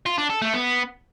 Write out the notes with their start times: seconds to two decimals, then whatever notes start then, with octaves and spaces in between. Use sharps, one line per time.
0.06 F4
0.18 D4
0.30 A4
0.42 A3
0.54 B3